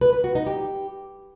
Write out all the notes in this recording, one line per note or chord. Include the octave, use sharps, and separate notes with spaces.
B4
B4
F#4
D#4
G4